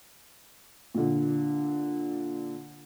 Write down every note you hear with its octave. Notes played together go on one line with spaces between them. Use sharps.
A#2 D3